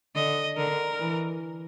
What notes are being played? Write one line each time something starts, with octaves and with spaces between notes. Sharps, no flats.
D3 D#5
D3 A#4
E3